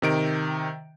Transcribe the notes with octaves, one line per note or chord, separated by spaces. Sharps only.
C3 D#3 D7